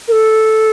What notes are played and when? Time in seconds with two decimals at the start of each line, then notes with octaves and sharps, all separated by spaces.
0.08 A#4
0.12 A4